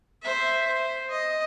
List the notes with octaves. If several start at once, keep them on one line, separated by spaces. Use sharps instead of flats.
C5 E5
C5
D#5